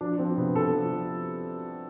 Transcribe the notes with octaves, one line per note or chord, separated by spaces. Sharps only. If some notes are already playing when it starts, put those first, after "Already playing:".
F3 D4
D4
F3 C4
C3 B3
C3 A4
F3
F3